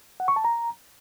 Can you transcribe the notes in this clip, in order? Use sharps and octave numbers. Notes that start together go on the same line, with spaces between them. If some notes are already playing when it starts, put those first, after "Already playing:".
F#5
C#6
A5
A#5